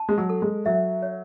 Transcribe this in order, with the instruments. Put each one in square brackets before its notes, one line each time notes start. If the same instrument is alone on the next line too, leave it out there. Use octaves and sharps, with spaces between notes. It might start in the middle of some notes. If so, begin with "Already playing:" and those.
Already playing: [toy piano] A5
[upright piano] G#3
F#3
[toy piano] A4
[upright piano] G#3
[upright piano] F#3 [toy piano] E5
[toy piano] C#5